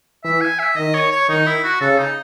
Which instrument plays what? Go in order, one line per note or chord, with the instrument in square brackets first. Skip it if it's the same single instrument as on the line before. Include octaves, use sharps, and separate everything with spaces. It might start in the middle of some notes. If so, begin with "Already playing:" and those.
[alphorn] E3 [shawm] E5
[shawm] G#5
E5
[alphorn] D#3 [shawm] D#5
[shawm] C#5
C#5
[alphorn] D#3 [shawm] D#4
[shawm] E4
F#4
[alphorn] C#3 [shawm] A4
[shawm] D#4